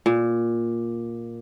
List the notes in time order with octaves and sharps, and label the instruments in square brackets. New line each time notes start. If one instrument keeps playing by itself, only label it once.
[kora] A#2